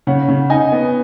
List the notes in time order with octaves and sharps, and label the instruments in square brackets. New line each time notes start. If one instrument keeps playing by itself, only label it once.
[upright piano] C#3 [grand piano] C#5 F#5
[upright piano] C#3
[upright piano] D#4 [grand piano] D#5 G#5
[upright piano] B3